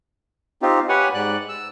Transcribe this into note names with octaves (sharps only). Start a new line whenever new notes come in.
C4 D#4 F4 G4
G4 B4 C#5 F#5 G#5
G#2 D5 F#6
E6